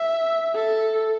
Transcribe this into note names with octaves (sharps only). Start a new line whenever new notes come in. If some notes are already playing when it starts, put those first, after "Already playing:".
Already playing: E5
A4